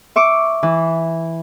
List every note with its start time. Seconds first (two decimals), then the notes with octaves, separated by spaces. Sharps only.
0.16 E5 C#6 D6
0.63 E3